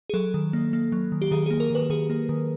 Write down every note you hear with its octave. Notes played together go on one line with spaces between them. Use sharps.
G#4
F#3 A4
D#3
A#3
A#3
F#3
D#3
G4
D#3 G#4
A#3 G#4
A#4
D#3 B4
D#3 G#4
A#3
D#3